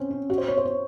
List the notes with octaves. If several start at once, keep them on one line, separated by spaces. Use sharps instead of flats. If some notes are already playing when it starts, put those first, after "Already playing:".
Already playing: C4 C#4
C#4
F#4
C5
C#5
C5
C#5